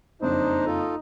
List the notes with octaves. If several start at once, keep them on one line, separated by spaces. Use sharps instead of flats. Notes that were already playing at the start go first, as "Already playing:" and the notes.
F#1 F2 D4 D#4 C5
F4 A4